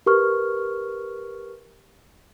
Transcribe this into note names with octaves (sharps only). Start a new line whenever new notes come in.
G4 A#4 B4 C#6 F6